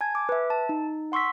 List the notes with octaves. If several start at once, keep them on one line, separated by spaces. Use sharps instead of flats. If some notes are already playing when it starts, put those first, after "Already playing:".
G#5 A5 G#6
D6
B4 E5
A5
D#4
F#5 C6 C#6 E6 B6